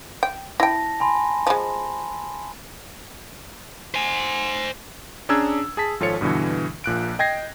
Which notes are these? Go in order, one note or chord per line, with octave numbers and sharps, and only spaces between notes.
G5
E4 G5 A5 A#6
G#5 B5 C6
F3 G#3
C5 G#5
C#4 D4 G#4 A#5 E6 G#6
G#4 A5 B6
G#1 F3 F4 A4 C#5 C#7
G2 B2 D3 E3
A#1 A#2 F#6 D7
D#5 G5 G#6 A#6 C7